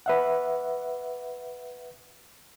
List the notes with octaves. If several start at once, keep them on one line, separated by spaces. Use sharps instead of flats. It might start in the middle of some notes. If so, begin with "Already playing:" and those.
B4 E5 F#5